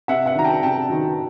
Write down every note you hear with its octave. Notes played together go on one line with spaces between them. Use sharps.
C3 E5 F#5
E5 F#5
D#3 F#3 A#5
G5 A5
C3 G5 A5
D#3 F#3